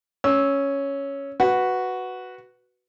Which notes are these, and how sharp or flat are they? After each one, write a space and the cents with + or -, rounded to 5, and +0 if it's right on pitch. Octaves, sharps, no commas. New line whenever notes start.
C#4 +0 E6 -10
F#4 +0 B4 +0